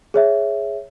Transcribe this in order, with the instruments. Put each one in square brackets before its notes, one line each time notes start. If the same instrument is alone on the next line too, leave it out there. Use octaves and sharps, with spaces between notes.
[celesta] G#4 C#5 E5